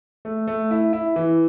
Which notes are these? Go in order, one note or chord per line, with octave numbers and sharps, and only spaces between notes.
A3
A3
E4
E4
E3